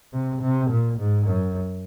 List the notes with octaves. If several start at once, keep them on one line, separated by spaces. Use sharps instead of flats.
C3
C3
A#2
G#2
F#2